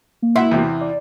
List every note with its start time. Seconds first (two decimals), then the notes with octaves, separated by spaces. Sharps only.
0.22 A#3
0.36 E4 E5 F#5 C6
0.51 E2 C3
0.81 D5